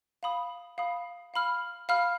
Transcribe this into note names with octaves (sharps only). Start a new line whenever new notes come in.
F5 B5 D#6
F5 B5 D#6
F5 B5 F6
F5 B5 F6